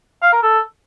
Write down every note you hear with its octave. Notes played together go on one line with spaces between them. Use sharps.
F5
A#4
A4